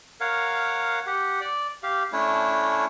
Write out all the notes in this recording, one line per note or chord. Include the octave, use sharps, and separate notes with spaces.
A#4 C#5 F5 F#5
G4 F#5
D5
G4 F5
A3 C#4 D4 E4